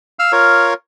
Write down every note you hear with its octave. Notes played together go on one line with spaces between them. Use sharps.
F5 E6 F6
F4 A#4 C#5